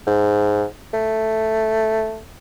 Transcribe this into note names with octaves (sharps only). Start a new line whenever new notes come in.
G#2
A3